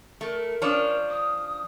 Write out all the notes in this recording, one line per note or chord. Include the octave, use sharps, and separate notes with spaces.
A3 A#4
F3 C#4 D4
D#6